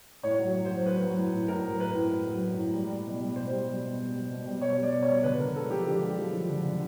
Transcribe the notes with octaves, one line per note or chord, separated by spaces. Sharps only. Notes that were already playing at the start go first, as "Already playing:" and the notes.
A2 C#5
F#3
F#3
F#3 C5
F#3 B4
F#3
A2
A2
A2 A#4
F#3
A2 B4
A2
A2
F#3
A2
A2
G3
G3
B2
G3
B2 C5
G3
G3
B2
G3
G3
B2
G3
B2 C#5
G3
D5
B2
C#5
G3
D3 B4
D3 A#4
G#3 A4
F3 G4
D3 G4
G#3
F3
F3
D3
D3